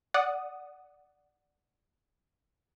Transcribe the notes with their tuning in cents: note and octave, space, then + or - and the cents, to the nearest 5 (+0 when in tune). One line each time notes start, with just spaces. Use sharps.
D5 +0 F#5 +0 D#6 -10